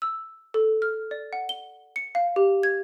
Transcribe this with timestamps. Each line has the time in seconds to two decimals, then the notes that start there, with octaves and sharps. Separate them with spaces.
0.02 E6
0.54 A4
0.82 F6
1.11 D5
1.33 F#5
1.49 G7
1.96 C#7
2.15 F5
2.36 G4
2.63 G#6